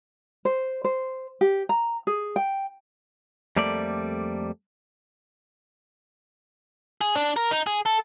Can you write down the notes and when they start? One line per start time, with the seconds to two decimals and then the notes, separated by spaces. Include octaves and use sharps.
0.45 C5
0.84 C5
1.41 G4
1.69 A#5
2.07 G#4
2.36 G5
3.56 F2 G3 A3 A#3 D5
7.01 G#4
7.15 D4
7.36 A#4
7.51 D#4
7.67 G#4
7.86 A4